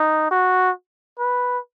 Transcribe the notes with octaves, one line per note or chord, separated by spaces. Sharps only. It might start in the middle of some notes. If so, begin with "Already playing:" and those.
Already playing: D#4
F#4
B4